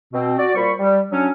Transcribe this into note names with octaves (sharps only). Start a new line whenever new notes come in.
B2 C4
F#4 D5
A#2 G3 C5 B5 C#6
G3
F#3 C#4 D4